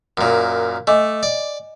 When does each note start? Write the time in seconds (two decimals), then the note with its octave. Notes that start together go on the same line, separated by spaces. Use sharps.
0.17 F#2 A#2
0.87 A3 D#5 G#5 D6
1.23 D5